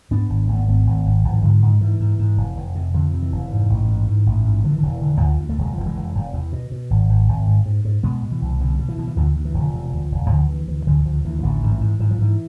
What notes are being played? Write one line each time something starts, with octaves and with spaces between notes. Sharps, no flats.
G#2 B3 D4
G#1
G#1 A3
B3
G#1 A3 C4
G#1
G#1
G#1 F3
E3
G#2 D3 F3
G#2
G#2 E3
G#2
G#2
F1
F1
C3
F2 D3 F3
C3
E3
F1
G#2
A1
G#2
G#2
A1
G#2
D3 F3
E3
D3
E1 E3
D3
D2 D3 F3
D2
A3
E1 G#3
F1 F3
E3 G#3
F1
F1
E2
B2
B2
G#1
G#1
G#1
G#2
G#2
G#2
B2 G#3 B3
B2
E3
C2
B2 D3
B2
E3
B2
E3
D2 D3 F3
D2
E3
E1
D3 F3
C3
D2
E1
D2 D3 F3
D2 E3
D2 E3
D2 D3 F3
E3
D2 D3 F3
D2 E3
E3
A1 D3
G#2 D3
E3
G#2
G#2 E3
F3
G#2 E3